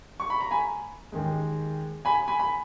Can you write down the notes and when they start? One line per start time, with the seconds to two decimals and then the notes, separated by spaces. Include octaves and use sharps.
0.20 C#6
0.30 B5
0.41 A#5
0.51 G#5 B5
1.12 D#2 D#3 G#3
2.05 G#5 B5
2.28 G#5 B5
2.40 B5